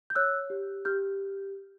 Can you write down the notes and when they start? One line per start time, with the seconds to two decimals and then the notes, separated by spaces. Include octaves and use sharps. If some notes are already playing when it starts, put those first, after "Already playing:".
0.10 G6
0.15 C#5 E6 F#6
0.50 G4
0.85 G4 F6 G6